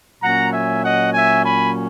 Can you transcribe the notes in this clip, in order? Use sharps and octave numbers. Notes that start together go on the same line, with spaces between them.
A#2 F#3 C#4 F#5 A#5
E5 G#5
D#5 F#5
E5 G#5
G#5 B5